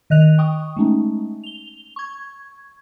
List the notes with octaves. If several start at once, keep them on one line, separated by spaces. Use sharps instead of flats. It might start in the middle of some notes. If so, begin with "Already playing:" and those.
D#3 D#5 F#6 F7
G5 C#6 D#6
G#3 A3 C#4 D#4
F7 G7
C#6 G#6